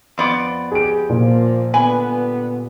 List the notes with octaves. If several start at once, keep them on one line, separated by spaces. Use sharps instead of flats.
F2 B3 D5
G4 G#4 D7
A#2 F3 A#3
D3 G3 B3 B4 G#5